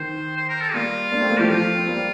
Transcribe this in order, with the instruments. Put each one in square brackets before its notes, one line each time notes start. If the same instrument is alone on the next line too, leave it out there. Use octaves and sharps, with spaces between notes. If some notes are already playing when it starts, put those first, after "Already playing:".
Already playing: [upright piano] D#3 [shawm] C5
[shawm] C5
A#4
A4
[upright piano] G3 A#3 [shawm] F4
[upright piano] A#3 D4
A3 C4
G3 A#3
[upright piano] F3 A3 [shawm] G4
[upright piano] F3 A3 [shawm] F4
[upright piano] C4
G3 A#3